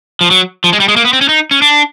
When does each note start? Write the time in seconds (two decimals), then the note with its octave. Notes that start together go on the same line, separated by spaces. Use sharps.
0.21 F3
0.31 F#3
0.64 F3
0.73 G#3
0.80 G3
0.88 G#3
0.96 A#3
1.05 B3
1.13 C4
1.21 C#4
1.29 D#4
1.51 C#4
1.62 D4